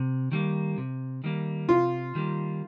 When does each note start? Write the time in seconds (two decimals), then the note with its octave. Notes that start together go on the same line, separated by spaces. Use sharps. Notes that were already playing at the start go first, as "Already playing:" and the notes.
Already playing: C3
0.32 D#3 G3 A#3
0.78 C3
1.24 D#3 G3 A#3
1.69 C3 F4
2.15 D#3 G3 A#3